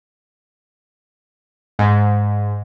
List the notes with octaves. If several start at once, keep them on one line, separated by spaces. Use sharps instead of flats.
G#2